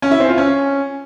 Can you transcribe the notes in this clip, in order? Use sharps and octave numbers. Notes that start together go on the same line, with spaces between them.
C#4
E4
C4
F4
C#4